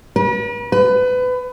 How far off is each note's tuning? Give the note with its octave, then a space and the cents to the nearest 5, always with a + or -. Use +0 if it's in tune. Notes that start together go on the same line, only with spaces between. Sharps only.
B4 -45
B4 +25